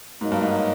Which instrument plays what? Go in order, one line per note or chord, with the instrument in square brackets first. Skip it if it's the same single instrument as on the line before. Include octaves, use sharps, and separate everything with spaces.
[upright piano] G#2 [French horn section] F#3 A#3 D#4
[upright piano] G2
G#2